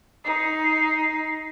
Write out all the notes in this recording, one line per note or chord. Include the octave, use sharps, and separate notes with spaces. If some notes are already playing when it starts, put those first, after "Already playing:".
D#4 C7